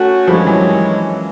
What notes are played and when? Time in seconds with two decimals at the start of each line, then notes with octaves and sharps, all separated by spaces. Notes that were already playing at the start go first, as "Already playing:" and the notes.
Already playing: A3 C#4 F#4
0.27 G2 D#3 F3 G3 G#3 C#4
0.46 E3 F#3